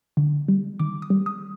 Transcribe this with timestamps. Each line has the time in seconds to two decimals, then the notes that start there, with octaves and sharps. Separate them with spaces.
0.17 D3
0.48 G3
0.79 D#3 D6
1.02 D#6
1.10 G3
1.26 D#6